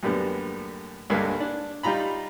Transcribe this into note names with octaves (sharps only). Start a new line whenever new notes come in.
F#2 A2 D3 G3 A#3 B3
C#2 G2 D3 G#3 A#3
D4
G3 D#4 F4 A#5 B5